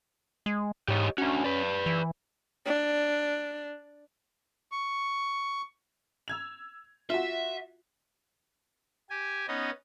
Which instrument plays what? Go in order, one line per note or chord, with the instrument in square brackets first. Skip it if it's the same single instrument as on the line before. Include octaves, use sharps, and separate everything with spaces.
[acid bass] G#3
[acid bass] G#2 [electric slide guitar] G4 C#5 D#5
[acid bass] C#4 [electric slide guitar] D4 F#4
[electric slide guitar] B4 D5
[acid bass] E3
[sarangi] D4
[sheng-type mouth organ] C#6
[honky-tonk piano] E6 G#6 F7
[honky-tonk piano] F4 F#4 [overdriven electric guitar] E5
[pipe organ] G4 G#5
B3 C#4 D#4 D#5